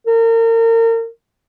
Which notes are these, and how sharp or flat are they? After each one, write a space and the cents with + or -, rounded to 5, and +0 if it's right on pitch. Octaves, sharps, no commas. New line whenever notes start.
A#4 -35